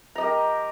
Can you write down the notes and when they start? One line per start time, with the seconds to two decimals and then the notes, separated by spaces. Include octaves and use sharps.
0.15 A#5
0.18 D#5
0.21 G4
0.23 A#4